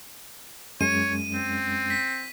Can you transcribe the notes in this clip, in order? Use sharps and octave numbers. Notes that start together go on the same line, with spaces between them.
F#2 G#3 C#4 C#5 D#7
C4
B6